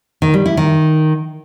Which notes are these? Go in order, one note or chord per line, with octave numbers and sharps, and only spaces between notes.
D#3
G3
E4
D#3